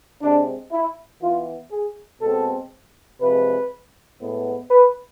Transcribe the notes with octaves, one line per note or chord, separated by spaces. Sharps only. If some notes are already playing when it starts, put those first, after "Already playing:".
C3 G#3 C4 D4
E4
E3 B3 F4
G#4
B2 G#3 C4 A4
C3 F3 G#3 B4
A2 G#3 B3
B4